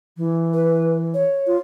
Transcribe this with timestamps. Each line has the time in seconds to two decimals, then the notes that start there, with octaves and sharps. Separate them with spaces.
0.17 E3
0.53 B4
1.14 C#5
1.47 F4